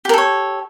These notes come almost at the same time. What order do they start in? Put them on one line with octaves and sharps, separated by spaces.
G4 A#4 A4 C#5